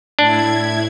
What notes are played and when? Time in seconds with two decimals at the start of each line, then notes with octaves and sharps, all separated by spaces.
0.19 A2 D4 E4 G#6